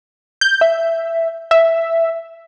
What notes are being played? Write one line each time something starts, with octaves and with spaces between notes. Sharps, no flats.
G6
E5
E5